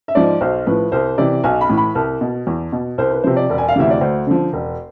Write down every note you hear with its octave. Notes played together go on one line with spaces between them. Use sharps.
E5
G#2 F3 D5
B1 C5
A2 F3 B4
C2 C5
C3 E3 D5
B1 G#5
B5
A2 E3
B5
C2 A5
B2
E2
B2
C2 C5
B4
C3 F3 C5
D5
E1
G#5
F5
D2 C3 E3 E5
D5
D2 C5
D3 F3
E1